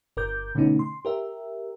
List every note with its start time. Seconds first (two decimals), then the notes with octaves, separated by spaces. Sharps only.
0.17 G1 A#4 D6 G6
0.55 B2 D3 A3 B3 C#4 D#4
0.79 C6
1.05 G4 A#4 E5